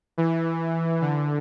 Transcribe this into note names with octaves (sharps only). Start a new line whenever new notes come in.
E3
D3